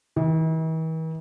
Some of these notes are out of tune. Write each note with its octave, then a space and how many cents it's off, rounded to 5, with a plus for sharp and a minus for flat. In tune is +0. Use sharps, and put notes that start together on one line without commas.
E3 -45